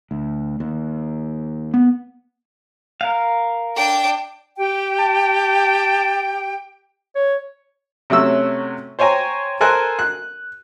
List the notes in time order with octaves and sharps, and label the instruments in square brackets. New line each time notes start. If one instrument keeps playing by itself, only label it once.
[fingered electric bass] D2
D#2
B3
[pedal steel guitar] A#4 F5
[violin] D4 G5
[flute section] G4 G5
[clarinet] A5
C#5
[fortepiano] C3 F#3 A3 C#4 E6
C5 C#5 G5 G#5 A#5
A4 A#4 C5 G#5 F#6
F#6